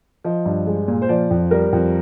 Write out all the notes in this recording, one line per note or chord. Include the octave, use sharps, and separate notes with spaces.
F3 D#5
G2
G#3
A#2
C5
F3 D5
F2
G3 A#4
F2